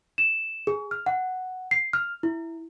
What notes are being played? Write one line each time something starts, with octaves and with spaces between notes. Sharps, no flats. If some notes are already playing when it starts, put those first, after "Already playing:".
E7
G#4
F6
F#5
C7
F6
E4